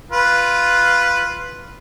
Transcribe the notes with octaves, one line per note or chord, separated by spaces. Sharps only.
F4 B4